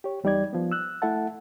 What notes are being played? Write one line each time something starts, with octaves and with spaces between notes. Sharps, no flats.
G4 C#5
E2 G3 D#4 D5 G#6
F3 B3
E6 F#6
A3 E4 A4 E5 F#5 A5